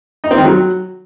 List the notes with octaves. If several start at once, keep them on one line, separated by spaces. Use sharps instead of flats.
D#4
C4
D#3
F#3